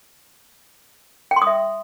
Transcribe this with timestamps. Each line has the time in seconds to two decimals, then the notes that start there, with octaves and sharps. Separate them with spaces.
1.31 G5
1.36 C6
1.42 D#6
1.47 E5